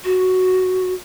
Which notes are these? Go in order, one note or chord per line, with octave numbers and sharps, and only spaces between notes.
F#4